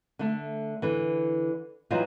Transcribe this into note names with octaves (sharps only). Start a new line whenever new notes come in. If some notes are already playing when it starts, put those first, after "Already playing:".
D3 A3
D3 E3
E3 F#3 G3 D#4 F4